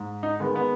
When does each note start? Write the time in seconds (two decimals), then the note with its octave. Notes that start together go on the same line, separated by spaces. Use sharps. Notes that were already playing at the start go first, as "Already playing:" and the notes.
Already playing: G#2
0.23 D#4
0.40 D#3 G#3 B3
0.56 B3